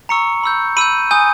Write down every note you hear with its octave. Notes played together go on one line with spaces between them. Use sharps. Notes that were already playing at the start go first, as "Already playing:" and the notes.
A#5 C#6 E6 C#7
B5 E6 G6
B5 E6 G6 D#7
G#5 D#6 G6